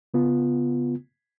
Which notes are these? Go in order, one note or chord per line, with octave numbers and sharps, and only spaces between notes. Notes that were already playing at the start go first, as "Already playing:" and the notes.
C#3 B3 F4